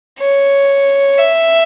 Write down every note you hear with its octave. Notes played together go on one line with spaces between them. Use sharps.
C#5
E5